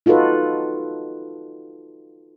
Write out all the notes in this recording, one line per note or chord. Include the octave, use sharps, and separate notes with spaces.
D#4 F4 F#4 A4 B4